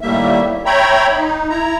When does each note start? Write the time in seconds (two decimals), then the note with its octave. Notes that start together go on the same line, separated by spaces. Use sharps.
0.01 D#2 A2 G3 A#3 E5
0.66 C#5 E5 G5 A#5 B5
1.11 D#4
1.50 E4 A#5